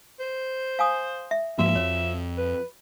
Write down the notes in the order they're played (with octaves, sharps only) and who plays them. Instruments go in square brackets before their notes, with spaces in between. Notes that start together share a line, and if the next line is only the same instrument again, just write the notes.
[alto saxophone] C5
[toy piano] F5 G#5 D#6
E5
[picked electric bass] G#2 F3 A#3 [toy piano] F#4 [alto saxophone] E5
[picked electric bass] F2 [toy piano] C#5
[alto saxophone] B4